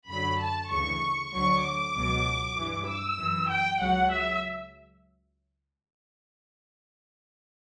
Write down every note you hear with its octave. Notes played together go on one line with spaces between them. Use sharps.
F#2 D3 F#3 B5
A5
D2 C#3 E3 C#6
D2 D3 F#3 C#6
D6
C#2 B2 F#3
G2 E3
E6
F#2 E3
G5
C#2 C#3 F#3 F#5
E5